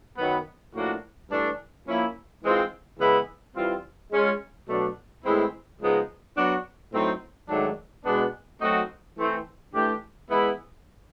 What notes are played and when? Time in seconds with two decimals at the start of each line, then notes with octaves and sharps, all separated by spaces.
0.17 F#2 D#3 F#3 B3
0.74 A2 F3 A#3 D4 F#4
1.29 G2 E3 A3 D4
1.86 F3 A#3 C#4 E4
2.42 G#2 E3 G#3 C4 F4
2.98 C#3 E3 G#3 B3 E4
3.55 E3 G3 C4 F4
4.11 G#3 C#4 F4
4.68 B2 F#3 A3 D4
5.24 A2 E3 G#3 C4 E4
5.80 C#3 F3 G#3 B3 D#4
6.36 F#3 B3 D4 F#4
6.92 A2 F#3 A3 C4 D#4
7.49 G#2 D#3 F#3 A3 D4
8.05 B2 G#3 B3 D4
8.61 F#3 A3 C4 D#4 F#4
9.18 E3 A3 C4
9.74 E3 A3 D4 G4
10.30 E3 G#3 B3 E4